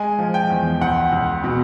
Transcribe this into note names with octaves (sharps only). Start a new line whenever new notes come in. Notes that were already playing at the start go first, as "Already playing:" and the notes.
Already playing: G#3 G#5
F3
G5
E2
C#2 F#5
C#2
B2